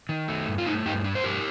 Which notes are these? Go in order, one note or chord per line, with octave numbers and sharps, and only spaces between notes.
D#3
A3
G2
F4
A3 D#4
G2 D#4 G4
D4
C5
G2 G4 A#4